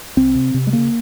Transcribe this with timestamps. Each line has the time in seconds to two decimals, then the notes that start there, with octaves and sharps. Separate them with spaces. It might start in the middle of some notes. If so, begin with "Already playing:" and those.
0.17 C2 C4
0.35 C3
0.54 C3
0.67 G#3
0.72 C#3 A#3